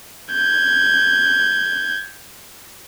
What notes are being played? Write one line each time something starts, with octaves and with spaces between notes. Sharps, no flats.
G6 G#6